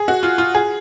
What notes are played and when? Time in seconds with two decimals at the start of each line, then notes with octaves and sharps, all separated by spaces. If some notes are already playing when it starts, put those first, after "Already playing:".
Already playing: G#4
0.08 F#4
0.23 F4
0.38 F4
0.55 G#4